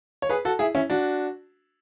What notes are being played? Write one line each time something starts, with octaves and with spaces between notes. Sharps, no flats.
C#5
G#4 B4
F#4 A4
E4 G#4
C#4 E4
D4 F#4